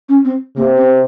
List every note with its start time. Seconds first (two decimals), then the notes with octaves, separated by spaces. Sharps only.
0.09 C#4
0.25 C4
0.57 C3 A#3
0.77 C4